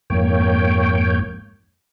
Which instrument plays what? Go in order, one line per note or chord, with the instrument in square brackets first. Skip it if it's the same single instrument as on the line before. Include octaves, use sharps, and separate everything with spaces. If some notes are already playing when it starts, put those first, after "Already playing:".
[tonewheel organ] F2 G#2 A#3 C#5 G5